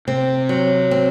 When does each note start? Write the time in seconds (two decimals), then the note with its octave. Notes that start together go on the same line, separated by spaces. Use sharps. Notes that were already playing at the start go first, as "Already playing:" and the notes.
0.07 C3 C4
0.49 F#3
0.91 C4